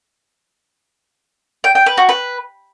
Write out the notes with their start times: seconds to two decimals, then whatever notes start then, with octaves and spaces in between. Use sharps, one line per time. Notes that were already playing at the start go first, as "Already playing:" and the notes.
1.64 G5
1.75 G5
1.86 B4
1.97 F#4
2.09 B4